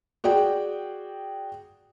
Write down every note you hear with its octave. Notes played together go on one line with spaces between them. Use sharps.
F#4 G#4 D5 G5